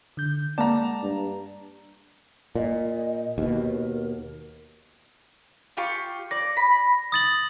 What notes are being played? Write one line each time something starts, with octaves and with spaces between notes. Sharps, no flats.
D3 G6
G#3 A#3 D5 F#5 A5 A#5
G2
A#2 D#5
D#2 B2 A#4
F4 G4 C#6
D5 A#6
B5
D#6 A6 F#7